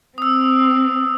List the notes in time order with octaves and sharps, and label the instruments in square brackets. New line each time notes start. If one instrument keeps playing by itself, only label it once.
[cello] C4 [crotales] D#6 E6